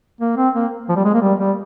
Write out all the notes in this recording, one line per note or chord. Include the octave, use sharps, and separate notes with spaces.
A#3
C4
A#3
F3
G3
G#3
A#3
G3
G3